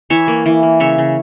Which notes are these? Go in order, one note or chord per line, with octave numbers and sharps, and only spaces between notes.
E3 C#5 E5
A#3
E3
A#3
C#3 C#5 E5
C#3